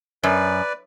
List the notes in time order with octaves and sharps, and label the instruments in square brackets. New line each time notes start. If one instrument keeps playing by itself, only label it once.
[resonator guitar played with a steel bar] F#2 [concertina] B4 D5